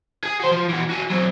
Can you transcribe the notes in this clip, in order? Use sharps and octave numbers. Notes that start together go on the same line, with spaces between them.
G#4 G#5
F#4 C5
F3
E3 F#4
F#4 G#4
F#3 C4